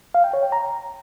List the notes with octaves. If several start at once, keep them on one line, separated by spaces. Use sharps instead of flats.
F5
G5
C#5
G5
A#5